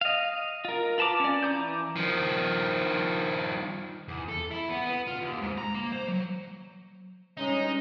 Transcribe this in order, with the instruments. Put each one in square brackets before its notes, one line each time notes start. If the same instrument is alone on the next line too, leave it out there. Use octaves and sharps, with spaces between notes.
[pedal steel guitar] D#5 F5
F4 A#4
F4 B4 A5 A#5 D6
C#4 D5
E3 A#5 D6 G6
[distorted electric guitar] D#3 F3
E2
A4
E4
B3
B3
F4
D#2
G#2
A#5
A#3
C5
F#3
[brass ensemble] G2 G#3 C#4 [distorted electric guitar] D#4